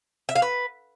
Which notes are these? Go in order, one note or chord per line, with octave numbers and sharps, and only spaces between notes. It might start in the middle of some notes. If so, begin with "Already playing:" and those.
E5
F5
B4